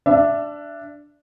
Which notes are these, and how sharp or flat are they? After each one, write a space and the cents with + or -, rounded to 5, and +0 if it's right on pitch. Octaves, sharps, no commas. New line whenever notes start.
D4 +0 E5 +25